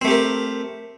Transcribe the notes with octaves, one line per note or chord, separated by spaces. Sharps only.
A3 C4 G4 A#4